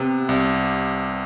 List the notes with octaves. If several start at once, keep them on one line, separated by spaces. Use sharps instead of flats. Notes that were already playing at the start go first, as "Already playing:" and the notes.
Already playing: C3 B3
C2